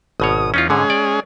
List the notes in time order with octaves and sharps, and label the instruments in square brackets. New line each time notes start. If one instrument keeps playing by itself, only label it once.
[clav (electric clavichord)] G#1 B2 C#5 [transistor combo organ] D#6
[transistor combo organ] E2 [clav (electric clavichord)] C#4 D#4 F4
[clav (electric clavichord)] G#2 D3 [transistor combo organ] G#3 C#4 G#4
[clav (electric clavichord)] D5